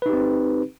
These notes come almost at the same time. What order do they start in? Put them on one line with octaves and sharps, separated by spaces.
B4 D#4 G4 C4